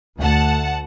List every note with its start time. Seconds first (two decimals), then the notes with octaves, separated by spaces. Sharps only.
0.20 D2 F#5 A5